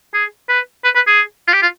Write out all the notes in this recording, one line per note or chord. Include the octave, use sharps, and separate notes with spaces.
G#4
B4
B4
B4
G#4
F4
G4
F4